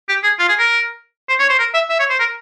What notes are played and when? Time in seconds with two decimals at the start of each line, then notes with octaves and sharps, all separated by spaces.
0.09 G4
0.23 G#4
0.39 F4
0.49 G#4
0.59 A#4
1.29 C5
1.39 C#5
1.49 C5
1.59 A#4
1.74 E5
1.89 E5
1.99 C#5
2.10 C5
2.20 A#4